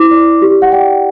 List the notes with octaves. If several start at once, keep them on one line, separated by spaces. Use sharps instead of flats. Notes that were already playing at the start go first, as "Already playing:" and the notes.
Already playing: E4 D6
D5
G4
F#5
D5 G5